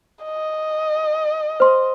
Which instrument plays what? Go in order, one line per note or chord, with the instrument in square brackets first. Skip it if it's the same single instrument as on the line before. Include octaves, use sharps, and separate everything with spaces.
[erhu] D#5
[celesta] C5 C6